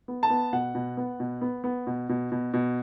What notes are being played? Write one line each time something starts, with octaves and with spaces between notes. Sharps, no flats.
B3
A5
B3
B2 F#5
B2
B3
B2
B3
B3
B2
B2
B2
B2